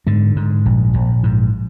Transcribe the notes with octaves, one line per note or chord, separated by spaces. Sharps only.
G#2 D3
G#2
A#1
A#1
G#2